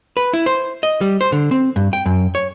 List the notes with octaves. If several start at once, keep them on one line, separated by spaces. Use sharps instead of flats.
B4
E4
C5
D#5
G3
C5
D3
C4
G2
G5
F#2
C#5